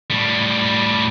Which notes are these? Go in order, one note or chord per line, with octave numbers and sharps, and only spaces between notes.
A2 G3